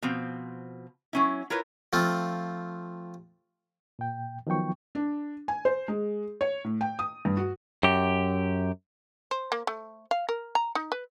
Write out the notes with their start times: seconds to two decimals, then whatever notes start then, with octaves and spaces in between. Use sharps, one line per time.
0.02 B2 F3 C4
1.13 F#3 C#4 E4
1.50 E4 F4 A#4 B4 C#5
1.93 F3 A3 C4 F4
3.99 A#2 G5
4.47 D#3 F3 F#3 B3 G5 C#6
4.95 D4
5.48 G#5
5.65 C5
5.88 G#3
6.41 C#5
6.64 A2
6.81 G5
6.99 D#6
7.25 G2
7.37 F#4
7.83 F#2 G4
9.31 C5
9.52 A#3
9.67 A3
10.11 F5
10.29 A#4
10.55 A#5
10.75 D#4
10.92 B4